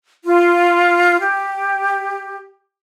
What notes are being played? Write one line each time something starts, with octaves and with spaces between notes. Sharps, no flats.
F4
G4